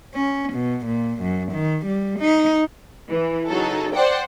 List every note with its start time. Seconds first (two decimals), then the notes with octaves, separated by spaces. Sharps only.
0.15 C#4
0.53 B2
0.86 A#2
1.21 F#2
1.52 D#3
1.86 G3
2.20 D#4
3.10 E3
3.47 C#3 F#3 D#4 A4
3.93 C5 D5 F#5 G5